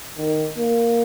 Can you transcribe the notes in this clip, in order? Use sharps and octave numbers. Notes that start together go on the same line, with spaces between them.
D#3
A#3